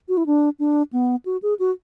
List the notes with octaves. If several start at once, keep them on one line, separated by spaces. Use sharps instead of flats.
F#4
E4
D4
D4
B3
F#4
G#4
F#4